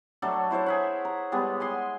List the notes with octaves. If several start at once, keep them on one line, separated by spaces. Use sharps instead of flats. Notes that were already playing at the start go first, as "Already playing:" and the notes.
F#3 A3 D4 A4
E4 C5 C#5 E5
G#4 E5 F#5
A#5
G3 G#3 B3
F#5 G#5 C6